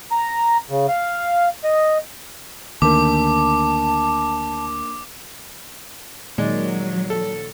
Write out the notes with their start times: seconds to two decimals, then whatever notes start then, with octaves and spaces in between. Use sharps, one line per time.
0.11 A#5
0.70 C#3
0.88 F5
1.64 D#5
2.82 D2 D#3 A#3 D4 A#4 A5 D6
6.38 A#2 D#3 F#3 G#3 D5
7.10 A4